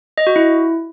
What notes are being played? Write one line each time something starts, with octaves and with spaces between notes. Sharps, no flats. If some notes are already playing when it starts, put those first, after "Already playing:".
D#5
F#4
E4